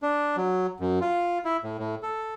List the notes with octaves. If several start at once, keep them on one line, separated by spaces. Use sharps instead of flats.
D4
F#3
F#2
F4
E4
A2
A2
A4